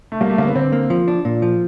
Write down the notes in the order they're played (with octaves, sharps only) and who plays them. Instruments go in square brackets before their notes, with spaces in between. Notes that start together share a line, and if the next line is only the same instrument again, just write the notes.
[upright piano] A3
[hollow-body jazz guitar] G3 [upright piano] A#3
[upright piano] A3
[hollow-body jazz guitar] D3 [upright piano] A#3
[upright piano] B3
[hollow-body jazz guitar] D3 [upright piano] C4
[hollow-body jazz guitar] A#3
F3
D4
A#2
F3